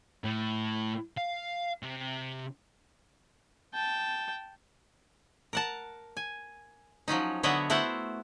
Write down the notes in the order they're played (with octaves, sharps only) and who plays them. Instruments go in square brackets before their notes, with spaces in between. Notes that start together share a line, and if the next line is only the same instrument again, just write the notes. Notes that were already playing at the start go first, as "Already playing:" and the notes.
[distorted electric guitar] A2
F5
C3
[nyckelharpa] G5 A5
[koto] A#4 F#5 A5
G#5
F3 F#3 C#4 D#4
D3 B3 C#5 D#5 E5 F#5
A3 B3 E4 F#4 C5 F#5